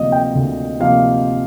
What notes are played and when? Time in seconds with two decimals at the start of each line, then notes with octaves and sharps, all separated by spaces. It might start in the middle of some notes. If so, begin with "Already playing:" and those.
Already playing: D2 C3 F3 A#3 D#5
0.12 G5
0.35 D2
0.80 C3 F3 A#3 F5